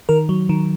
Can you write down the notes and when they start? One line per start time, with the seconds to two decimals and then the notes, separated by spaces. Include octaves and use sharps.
0.09 D#3 A#4
0.29 F#3
0.49 D#3